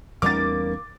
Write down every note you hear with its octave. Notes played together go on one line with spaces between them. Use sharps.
E2 G3 A#3 C#4 D#4 A#4 D6 A6